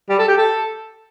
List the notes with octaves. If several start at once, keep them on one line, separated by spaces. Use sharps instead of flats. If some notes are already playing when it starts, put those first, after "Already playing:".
G3
A4
G4
A4